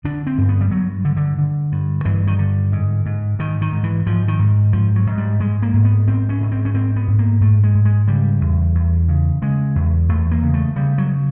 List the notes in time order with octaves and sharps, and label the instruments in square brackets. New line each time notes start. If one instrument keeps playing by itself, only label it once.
[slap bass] D3 D4
C4
G2
B3
G3
G2 F#3
D3
D3
D3
G2
G2 E3
D#3
D3
G#2
G#2
G#2 D#3
D#3
G#2
E3
G#2 F3
D#3
G#2
G#2 F3
F#3
G#2
G3
G#2 G#3
A#3
G#2
B3
G#2 C4
C#4
G#2
C4
C#4
G#2 C4
B3
G#2
A#3
G#2 A3
G#3
G#2
G#3
C#3 G3
E2
E2
C#3
C#3 G#3
E2
E2 A3
A#3
C#3
A3
C#3 G3
F#3